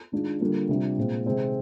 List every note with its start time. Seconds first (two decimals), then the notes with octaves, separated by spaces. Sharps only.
0.12 D#3 G#3 D4 F4
0.41 D3 G3 A#3 F4
0.69 C3 G3 D4 F4
0.97 A#2 G#3 C4 F4
1.25 C3 D#3 G#3 C4 D#4